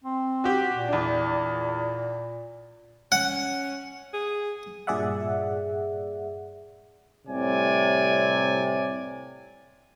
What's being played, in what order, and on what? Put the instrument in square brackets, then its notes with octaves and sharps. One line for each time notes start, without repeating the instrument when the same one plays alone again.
[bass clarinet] C4
[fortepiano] F#4 G4
[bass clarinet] A#2
[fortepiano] E2 D4
[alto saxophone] C#4 [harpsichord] F#5
[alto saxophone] G#4
[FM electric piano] G2 A#2 G#4 D5 E5 F#5
[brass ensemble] C2 A2 C3 C#5 D5 G#5